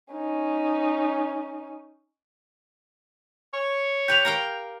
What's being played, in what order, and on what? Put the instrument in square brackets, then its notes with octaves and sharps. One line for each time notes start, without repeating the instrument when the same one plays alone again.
[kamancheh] C#4 D#4
[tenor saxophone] C#5
[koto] G4 B4 [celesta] G6 F7
[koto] A#4 F5 G5